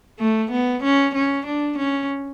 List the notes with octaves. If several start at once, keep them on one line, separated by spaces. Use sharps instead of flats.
A3
B3
C#4
C#4
D4
C#4